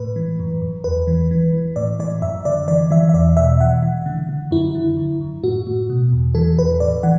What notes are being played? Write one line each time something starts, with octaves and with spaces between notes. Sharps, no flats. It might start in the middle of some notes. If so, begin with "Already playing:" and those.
Already playing: A2 B4
E3
F#2
F#2
E2 B4
E3
E3
E3
A2 D5
E3 D5
F#2 E5
D3 D5
E3 D5
E3 E5
E5
E2 D5
B2 E5
E3 F#5
E3
D3
D3
F#2 E4
D3
F#2
F#2
A2 F#4
A2
B2
E2
E3 A4
E2 B4
A2 D5
E3 F#5